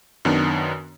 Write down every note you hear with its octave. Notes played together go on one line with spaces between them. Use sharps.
F#2 D#3 B3 D4